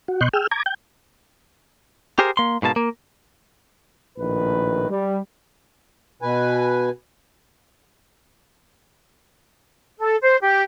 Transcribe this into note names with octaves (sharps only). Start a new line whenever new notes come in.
F#4
B2 D#5 C6 C#6 F#6 G6
G#4 G5 E6 F6
A#5 D6 G#6
G5 G6
G4 G#4 A#4 C5
A#3 C6
G#2 B2 A#3 A5
A#3
A#1 A2 D#3 B4
G3
B2 B4 G#5
A4
C5
G4